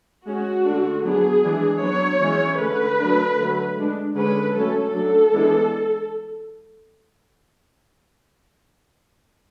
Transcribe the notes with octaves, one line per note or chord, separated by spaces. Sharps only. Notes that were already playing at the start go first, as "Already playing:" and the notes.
G#3 C#4 F#4
D3 A3 D4
F#3 B3 D4 G#4
E3 G#3 D4
F#3 B3 D4 C#5
E3 G#3 C#4
D3 A3 C#4 B4
F#3 A3 D4
D3 F#3 A3
G#3 D4
D3 G#3 C#4 B4
F#3 A3 C#4 A4
F#3 A3 D4 A4
E3 G#3 B3 D4